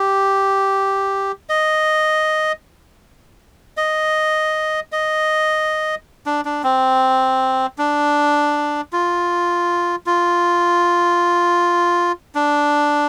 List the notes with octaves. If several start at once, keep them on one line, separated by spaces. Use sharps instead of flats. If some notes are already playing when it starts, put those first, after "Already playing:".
Already playing: G4
D#5
D#5
D#5
D4
D4
C4
D4
F4
F4
D4